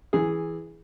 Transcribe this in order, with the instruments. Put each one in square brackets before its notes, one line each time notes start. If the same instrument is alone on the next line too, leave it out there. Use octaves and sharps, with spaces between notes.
[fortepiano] E3 G#4